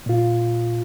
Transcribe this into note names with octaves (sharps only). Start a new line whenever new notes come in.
A#2 F4